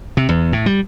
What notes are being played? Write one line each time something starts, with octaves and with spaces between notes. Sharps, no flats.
C3
E2
A2
G3